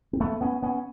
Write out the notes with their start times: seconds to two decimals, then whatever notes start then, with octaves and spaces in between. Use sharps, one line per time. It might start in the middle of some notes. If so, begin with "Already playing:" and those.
0.13 C4
0.20 A3 B3
0.41 B3 C#4
0.62 B3 C#4